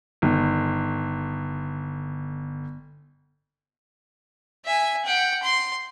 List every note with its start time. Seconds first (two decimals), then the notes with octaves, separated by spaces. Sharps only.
0.22 G1 D#3
4.66 E5 G#5
5.05 F#5 G5
5.43 C6